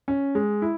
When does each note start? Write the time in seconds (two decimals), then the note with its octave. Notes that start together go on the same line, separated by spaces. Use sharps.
0.08 C#4
0.35 G#3
0.62 E4